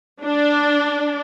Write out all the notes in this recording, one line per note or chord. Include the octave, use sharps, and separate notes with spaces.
D4